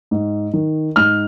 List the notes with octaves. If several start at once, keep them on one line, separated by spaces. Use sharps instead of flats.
G#2
D#3
G#2 F6